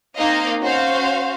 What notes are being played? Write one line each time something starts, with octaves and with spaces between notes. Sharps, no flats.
A#3 C4 D#4 D#5 F5
C#4 F#4 C5 F5